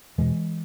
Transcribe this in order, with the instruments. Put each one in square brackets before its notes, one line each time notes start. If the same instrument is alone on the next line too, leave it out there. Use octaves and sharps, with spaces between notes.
[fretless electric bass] E2 B2 E3 G#3